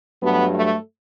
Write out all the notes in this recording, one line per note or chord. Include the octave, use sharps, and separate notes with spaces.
G2 F#3 A3 B3
A3